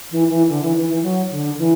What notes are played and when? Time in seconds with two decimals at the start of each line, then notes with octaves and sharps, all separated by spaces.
0.11 E3
0.30 E3
0.49 D3
0.62 E3
0.76 E3
0.89 E3
1.03 F#3
1.31 D3
1.58 E3